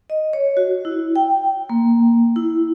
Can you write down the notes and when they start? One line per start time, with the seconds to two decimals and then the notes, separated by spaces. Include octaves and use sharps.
0.10 D#5
0.33 C#5
0.57 F#4
0.85 E4
1.16 G5
1.70 A#3
2.36 E4